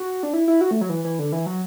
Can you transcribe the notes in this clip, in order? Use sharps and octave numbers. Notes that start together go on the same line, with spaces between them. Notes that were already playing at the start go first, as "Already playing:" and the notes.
Already playing: F#4
D4
E4
E4
F#4
A3
F#3
E3
E3
D3
E3
F#3